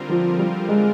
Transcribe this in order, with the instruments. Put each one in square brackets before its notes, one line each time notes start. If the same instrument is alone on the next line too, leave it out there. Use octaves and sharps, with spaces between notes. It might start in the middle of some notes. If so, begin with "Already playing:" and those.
Already playing: [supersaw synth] D3 G3 C4 F4 A#4
[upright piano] F3
G3
G#3